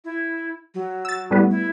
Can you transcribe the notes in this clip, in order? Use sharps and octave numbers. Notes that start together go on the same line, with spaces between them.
E4
F#3
E6 A6
A2 G3 B3
E4